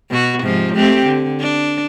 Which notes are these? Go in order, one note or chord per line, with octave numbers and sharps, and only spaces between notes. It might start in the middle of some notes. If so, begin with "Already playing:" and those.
B2 F#4
G#2 C3 F3
A3 C4 G4
D3
D4